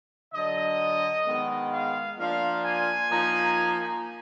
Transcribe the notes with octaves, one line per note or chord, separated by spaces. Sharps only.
D3 F#3 D4 D#5
D#3 G#3 B3
F5
F3 A#3 D4 F4 F5
G#5
F3 A#3 D#4